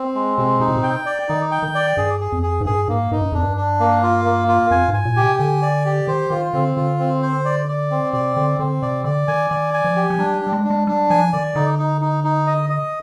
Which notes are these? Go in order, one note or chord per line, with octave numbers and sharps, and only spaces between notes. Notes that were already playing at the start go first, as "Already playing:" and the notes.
Already playing: C4
G#3
C3 C4
C3 D#4
A#2
C3
G5
D5
D#3 D#4
G5
D#3
D5
G2 G#4
G#4
F2
G#4
G#2
G2 G#4
G#2 A#3
G#2 D#4
G2
F2 D4
G2
D4
A#3
F4
A#3
F4
F2 G#5
G#2
G#5
A#2
G4
C3
D3 G#5
D5
G4
D#3 C5
D#3 F4
D3 C4
D3 F4
C4
C5
D5
D5
C4
C3 D5
D3 C4
D3 C4
C3 D5
D3 D5
D#3 G#5
D#3 D5
G#5
F3
G4
F3
G3 D4
D4
G3
G#3
D4
G#3
G3 D4
F3 G#5
D#3 D5
D3 D#4
D#4
D#4
D#4
D#5
D#5